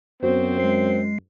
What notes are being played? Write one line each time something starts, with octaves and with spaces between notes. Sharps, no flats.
F#2 B3 C4 F#4 C5
G#3 C7